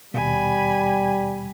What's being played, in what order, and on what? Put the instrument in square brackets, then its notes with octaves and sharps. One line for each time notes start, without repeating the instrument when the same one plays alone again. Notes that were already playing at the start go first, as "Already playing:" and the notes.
[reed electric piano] D#2 B2 [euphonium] G3 [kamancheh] G#5 B5